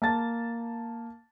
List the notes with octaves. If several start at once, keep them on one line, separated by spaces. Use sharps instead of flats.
A#3 A5 A6